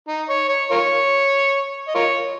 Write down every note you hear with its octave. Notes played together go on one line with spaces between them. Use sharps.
D#4
C#5
C#5
F4 A#4 C#5
D#5
F4 A#4 C#5